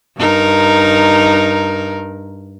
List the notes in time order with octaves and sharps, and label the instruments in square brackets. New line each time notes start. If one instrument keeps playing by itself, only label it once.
[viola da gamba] G2 D#4 A#4